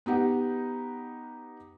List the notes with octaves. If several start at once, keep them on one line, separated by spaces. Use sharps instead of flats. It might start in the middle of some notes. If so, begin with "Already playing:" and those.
B3 D#4 G4 F#5